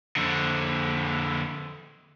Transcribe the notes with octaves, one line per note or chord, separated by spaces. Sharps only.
F2 D3